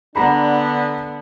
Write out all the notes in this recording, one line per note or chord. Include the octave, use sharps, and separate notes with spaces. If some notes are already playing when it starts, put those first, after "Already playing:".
D3 B3 D4 F#5 A#5 B5